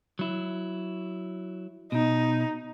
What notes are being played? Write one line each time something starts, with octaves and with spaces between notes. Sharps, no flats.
F#3 E4
B2 D#4